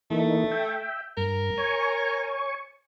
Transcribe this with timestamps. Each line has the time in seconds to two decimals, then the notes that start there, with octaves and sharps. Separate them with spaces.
0.10 E3 A3 A#3 D#4
0.51 E5 G5
1.17 G2 A#4
1.58 C#5 G#5 C#6